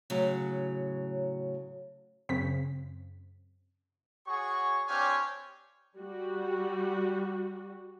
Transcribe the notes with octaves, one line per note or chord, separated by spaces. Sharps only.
A2 C#3 F#3
F#2 C#3 C4 B6
F#4 G#4 C#5 C#6
C4 D4 G4 C#5 F5 G#5
G3 F#4